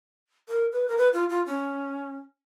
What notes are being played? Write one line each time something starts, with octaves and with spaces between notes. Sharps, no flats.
A#4
B4
A#4
B4
F4
F4
C#4